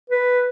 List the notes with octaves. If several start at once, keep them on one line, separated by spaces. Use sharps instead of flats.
B4